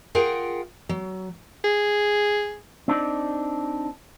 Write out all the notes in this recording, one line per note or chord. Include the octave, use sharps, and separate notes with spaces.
F4 G#4 A#4 F#5 G5
F#3
G#4
C4 D4 D#4 D5